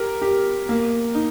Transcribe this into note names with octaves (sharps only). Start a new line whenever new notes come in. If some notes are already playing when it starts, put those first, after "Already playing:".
Already playing: G4 A#4
G4
A#3
D#4